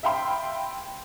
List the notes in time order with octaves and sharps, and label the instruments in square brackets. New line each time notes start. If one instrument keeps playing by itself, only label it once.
[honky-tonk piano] E5 F5 G5 B5 C6